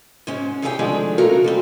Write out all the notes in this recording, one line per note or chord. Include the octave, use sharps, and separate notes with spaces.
G#2 G#3 C#4
C#3 E3 G4 G#4 F#5 G5
D#3 F3 G#3 A3 C4 D4
C#3 F3 F#3 A3 F#4 A#4
G3 G#3 C4